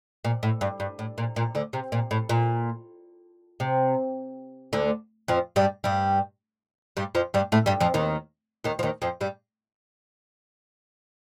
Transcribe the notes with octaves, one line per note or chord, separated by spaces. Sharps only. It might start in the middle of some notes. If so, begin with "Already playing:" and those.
A#2
A2
G2
G2
A2
A#2
A#2
D2 D3
C3
A#2
A2
A#2
C3
D2 D3
F2 F3
G2 G3
G2 G3
G2 G3
F2 F3
G2 G3
A2 A3
G2 G3
F2 F3
D#2 D#3
D#2 D#3
F3
D#2 D#3
F2 F3
G2 G3